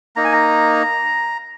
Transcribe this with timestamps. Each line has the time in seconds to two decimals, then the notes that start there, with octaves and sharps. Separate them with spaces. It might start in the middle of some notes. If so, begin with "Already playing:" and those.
0.16 A#3 D#4 A#5
0.25 G#5
0.33 A#5